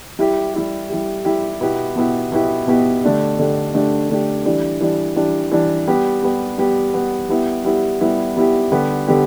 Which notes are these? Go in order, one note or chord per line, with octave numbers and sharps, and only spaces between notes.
G3 E4 G4
G3 E4 G4
G3 E4 G4
G3 E4 G4
B2 B3 E4 G4
B2 B3 E4 G4
B2 B3 E4 G4
B2 B3 E4 G4
D3 A3 D4 G4
D3 A3 D4 G4
D3 A3 D4 G4
D3 A3 D4 G4
E3 G3 D4
E3 G3 D4
E3 G3 D4
E3 G3 D4
G3 B3 G4
G3 B3 G4
G3 B3 G4
G3 B3 G4
G3 B3 E4 G4
G3 B3 E4 G4
G3 B3 E4 G4
G3 B3 E4 G4
D3 G3 B3 G4
D3 G3 B3 G4